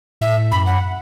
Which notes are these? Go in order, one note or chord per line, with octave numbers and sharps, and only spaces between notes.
A2 E5
F#2 B5
F#5